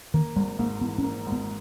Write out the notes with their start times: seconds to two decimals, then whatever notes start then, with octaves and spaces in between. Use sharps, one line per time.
0.14 D#3 A#3
0.36 G#1 G3
0.59 G#2 A#3
0.81 E3 B3
0.98 C#4
1.04 A#3
1.26 G#1
1.32 B3